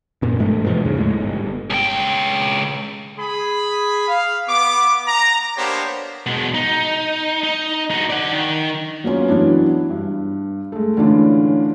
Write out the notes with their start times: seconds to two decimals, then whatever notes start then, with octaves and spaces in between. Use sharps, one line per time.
0.22 F#2 A#2
0.39 A1 G2 G#3 A3
0.65 G2 B2 E3 F3
0.85 D#2 G#2 C#3
0.97 A2 G#3
1.20 G1
1.70 C#2 G5
3.18 G#4 B5
4.08 F5
4.47 B3 D6
5.06 A#5
5.56 A#3 B3 D4 G4 C5 C#5
6.26 B2 G#3
6.54 D#4
7.43 D#4
7.91 D#4 F#4
8.10 D5 F#5
8.32 D#3
9.04 F#3 A#3 B3 C#4 F4
9.28 E3 F#3 B3 D4 E4
9.90 G2
10.72 G#3 A3
10.97 A2 D3 E3 C#4 D4 F4